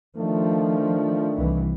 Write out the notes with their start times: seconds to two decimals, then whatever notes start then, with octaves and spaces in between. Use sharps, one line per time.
0.17 D#3 F3 A3 D4
1.35 C2 E3